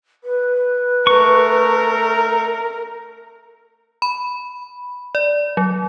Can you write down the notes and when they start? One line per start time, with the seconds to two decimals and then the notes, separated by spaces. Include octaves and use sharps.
0.24 B4
1.07 A3 A#4 C#6
4.02 B5
5.15 D5
5.57 F#3